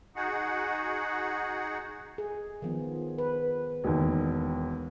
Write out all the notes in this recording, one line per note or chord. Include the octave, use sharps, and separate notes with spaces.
D#4 F#4 G#4 F#5
G#4
D#3 F3 B3
B4
E1 D#2